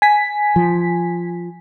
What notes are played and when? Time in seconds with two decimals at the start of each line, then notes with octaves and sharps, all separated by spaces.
0.02 G#5 B6
0.56 F3